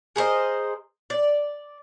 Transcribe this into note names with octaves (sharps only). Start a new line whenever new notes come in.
G#4 A#4 C5 D#5
D5